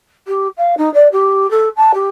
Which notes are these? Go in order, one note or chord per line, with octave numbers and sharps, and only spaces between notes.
G4
F5
D#4
D5
G4
A4
A5
G4